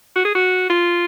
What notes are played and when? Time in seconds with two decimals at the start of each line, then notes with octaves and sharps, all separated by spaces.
0.16 F#4
0.25 G#4
0.35 F#4
0.70 F4